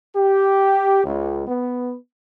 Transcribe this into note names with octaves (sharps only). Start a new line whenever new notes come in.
G4
C#2
B3